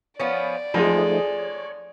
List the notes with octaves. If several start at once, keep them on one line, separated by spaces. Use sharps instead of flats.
F3 B3 C#4 D5
F2 F3 G#3 A3 D#4 G#4
C#5